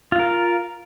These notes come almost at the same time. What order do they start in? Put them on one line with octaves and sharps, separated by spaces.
F4 F5 A#4